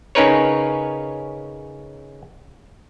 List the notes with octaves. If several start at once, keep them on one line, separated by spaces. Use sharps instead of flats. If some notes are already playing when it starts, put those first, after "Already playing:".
C#3 C#4 D#4 A#4 B4 C#5